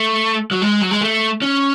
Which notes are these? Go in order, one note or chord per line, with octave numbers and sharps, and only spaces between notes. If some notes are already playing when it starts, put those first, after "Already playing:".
Already playing: A3
F#3
G#3
F#3
G#3
A3
C#4